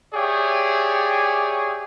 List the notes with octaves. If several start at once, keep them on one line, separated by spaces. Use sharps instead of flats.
G4 G#4 C#5 D5 E5 G5